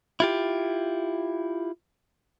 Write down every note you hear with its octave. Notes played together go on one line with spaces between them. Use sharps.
E4 F4 G4